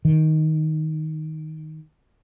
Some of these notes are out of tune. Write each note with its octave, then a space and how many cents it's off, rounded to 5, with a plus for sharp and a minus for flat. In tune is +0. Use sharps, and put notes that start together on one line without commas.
D#3 +5